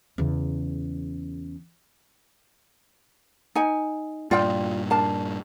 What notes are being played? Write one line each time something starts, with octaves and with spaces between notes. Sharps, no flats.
E2 C#3
D#4 G#5
G2 A#2 F4 D5 G5
D4 A#4 A5